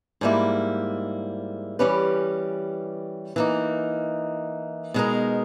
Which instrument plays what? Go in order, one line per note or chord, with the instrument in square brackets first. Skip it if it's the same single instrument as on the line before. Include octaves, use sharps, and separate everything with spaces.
[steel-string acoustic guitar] G#2 G3 A#3 E4
E3 G3 C#4 G4 B4
E3 A#3 D#4
B2 G#3 D#4 A#4